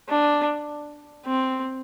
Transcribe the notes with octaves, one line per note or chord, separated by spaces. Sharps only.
D4
C4